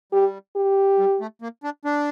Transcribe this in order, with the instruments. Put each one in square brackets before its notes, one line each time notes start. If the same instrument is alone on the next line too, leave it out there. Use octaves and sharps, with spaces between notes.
[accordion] G3 [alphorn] G4
[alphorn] G4
[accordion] G3
A3
A#3
D4
D4